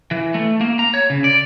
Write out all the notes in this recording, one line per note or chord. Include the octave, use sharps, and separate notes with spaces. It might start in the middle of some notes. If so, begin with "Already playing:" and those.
E3
A3
A#3
A#5
C#5
C#3
D5